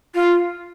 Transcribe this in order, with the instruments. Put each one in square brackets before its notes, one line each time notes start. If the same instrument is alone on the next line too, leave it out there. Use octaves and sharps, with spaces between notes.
[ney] F4